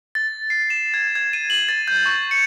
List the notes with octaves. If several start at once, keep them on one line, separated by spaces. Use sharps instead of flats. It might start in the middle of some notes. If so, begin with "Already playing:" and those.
A6
C7
E7
G#6
G#6
D#7
F#7
A6
G6
C#6
C#7